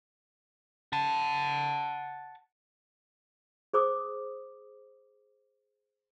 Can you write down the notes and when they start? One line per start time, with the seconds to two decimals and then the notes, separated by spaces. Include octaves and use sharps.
0.93 F#5 A5
3.73 G#4 C5 D6 D#6